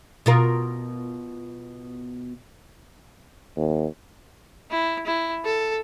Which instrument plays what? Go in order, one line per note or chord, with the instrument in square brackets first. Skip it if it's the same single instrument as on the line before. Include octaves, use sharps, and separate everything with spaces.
[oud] B2 F4 A#4
[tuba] D#2
[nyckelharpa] E4
E4
A4